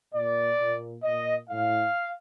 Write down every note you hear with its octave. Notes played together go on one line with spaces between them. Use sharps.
A#2 D5
A#2
A#2 D#5
A2 F5